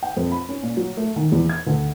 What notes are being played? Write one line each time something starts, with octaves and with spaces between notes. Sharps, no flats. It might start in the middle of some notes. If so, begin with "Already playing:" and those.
G5
F2
B5
C#4
A#2
F#3
A3
D#3
E2
G#6
D2